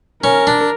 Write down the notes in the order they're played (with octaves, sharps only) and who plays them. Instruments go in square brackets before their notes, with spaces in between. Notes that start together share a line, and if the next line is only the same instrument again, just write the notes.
[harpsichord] C#4 [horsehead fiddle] A#4
[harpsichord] D4